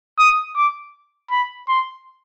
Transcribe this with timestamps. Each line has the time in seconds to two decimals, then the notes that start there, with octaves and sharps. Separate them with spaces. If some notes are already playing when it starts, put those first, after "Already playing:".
0.19 D#6
0.56 D6
1.31 B5
1.68 C6